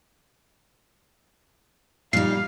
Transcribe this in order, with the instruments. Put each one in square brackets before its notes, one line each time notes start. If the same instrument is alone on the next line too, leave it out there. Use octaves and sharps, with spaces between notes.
[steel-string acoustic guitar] A#2 D#4 [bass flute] G3 [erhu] F5 [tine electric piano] C7